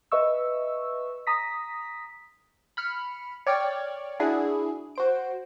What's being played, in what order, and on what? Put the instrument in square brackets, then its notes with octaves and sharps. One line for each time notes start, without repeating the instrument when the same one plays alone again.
[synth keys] B4 D#5 E5 C#6 E6
A#5 D#6 A#6 B6
[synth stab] B5 F6 C#7
C#5 D5 G5 F6 G#6
D4 E4 F#4 G#4
F#4 C5 D7